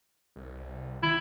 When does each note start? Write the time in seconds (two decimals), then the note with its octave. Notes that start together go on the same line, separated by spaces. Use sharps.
0.36 C2
1.03 D#3 E4